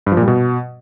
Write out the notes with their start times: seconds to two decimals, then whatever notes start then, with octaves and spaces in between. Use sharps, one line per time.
0.06 G2
0.12 F3
0.17 A#2
0.22 G3
0.28 B2